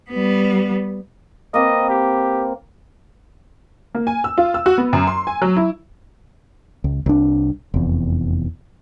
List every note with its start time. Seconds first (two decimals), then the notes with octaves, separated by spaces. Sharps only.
0.11 G3 B3
1.54 A#3 C4 B4 D#5
1.90 G4
3.95 A#3
4.07 G#5
4.24 E6
4.38 F4
4.54 E6
4.66 F#4
4.78 B3
4.93 F#2
5.07 C6
5.27 G#5
5.42 F#3
5.57 E4
6.84 C#2
7.06 C2 D4
7.74 F1 E2